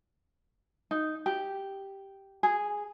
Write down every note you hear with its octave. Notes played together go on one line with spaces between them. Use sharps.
D#4
G4
G#4